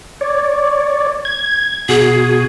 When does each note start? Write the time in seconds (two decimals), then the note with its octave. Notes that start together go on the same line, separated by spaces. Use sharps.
0.21 C#5 D5
1.25 G#6
1.89 B2 F#4 G#4 G#5